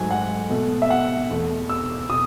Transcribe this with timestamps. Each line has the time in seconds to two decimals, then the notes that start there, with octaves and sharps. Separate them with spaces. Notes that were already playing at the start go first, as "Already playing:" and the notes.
Already playing: G#2 F#3 A3 G#5
0.11 F#5
0.50 B2 A3
0.82 E5
0.90 F#5
1.30 E2 B2 A3
1.69 E6
2.09 B2 D#6